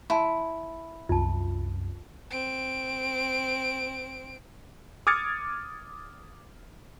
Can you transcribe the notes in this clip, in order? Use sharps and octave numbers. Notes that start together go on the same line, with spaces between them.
E4 A5 C6
C2 F#2 F4 A5
C4 D7
D6 D#6 F6 G#6 A6 C#7